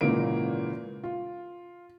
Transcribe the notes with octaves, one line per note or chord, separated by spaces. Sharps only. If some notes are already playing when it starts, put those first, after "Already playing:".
G#1 A#2 C#3 E3 A#3 D7
F4